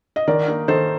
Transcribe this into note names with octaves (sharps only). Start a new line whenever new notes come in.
D#5
D#3 A#4 D5
A#3 D#4
D#3 A4 C5